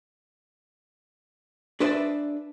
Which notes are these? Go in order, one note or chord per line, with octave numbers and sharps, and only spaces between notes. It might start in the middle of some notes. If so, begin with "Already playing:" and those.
D4 G#4 B4 C5 D5 E5